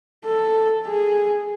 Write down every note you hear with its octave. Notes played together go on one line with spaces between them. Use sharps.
A4
G#4